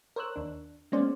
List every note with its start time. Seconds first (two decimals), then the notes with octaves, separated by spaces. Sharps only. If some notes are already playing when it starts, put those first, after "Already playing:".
0.16 A#4 C5 C#5 E6 F#6
0.36 D#2 D4
0.92 G#3 A#3 B3 C#4 C5 D5